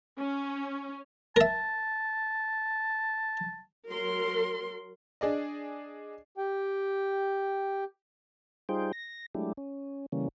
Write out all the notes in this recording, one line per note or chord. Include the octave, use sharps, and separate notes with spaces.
C#4
A#4 E5 A5
F#3 A#4 C6
D4 G#4 D5 D#5
G4 G5
G3 D#4 F4 G#4 C5 G5
A#6
F#3 G#3 A3 D4 E4 G4
C#4
C#3 E3 G3 A#3 C#4